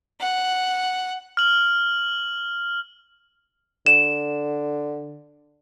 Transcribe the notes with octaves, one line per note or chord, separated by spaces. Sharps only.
F#5
F6 F#7
D3 E7